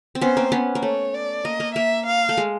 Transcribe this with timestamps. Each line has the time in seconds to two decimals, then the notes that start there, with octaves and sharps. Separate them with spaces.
0.15 C4
0.21 B3 C#4 C5
0.37 A#3 C4
0.52 B3 C#4
0.75 A#3
0.83 A3 C#5
1.14 D5
1.45 A#3 D#5
1.60 A#3
1.75 A#3 E5
2.07 F5
2.29 A3
2.37 G#3